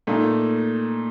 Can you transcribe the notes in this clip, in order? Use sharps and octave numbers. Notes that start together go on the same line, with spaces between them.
A#2 A3 D#4